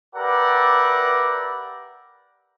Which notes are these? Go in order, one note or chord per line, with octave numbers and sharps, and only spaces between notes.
G4 A#4 B4 D5 E5 F#5